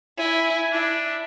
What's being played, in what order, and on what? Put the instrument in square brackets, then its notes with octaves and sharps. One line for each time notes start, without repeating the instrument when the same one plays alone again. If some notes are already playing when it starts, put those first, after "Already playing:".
[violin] E4 [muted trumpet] G#5
[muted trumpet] D4 [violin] E4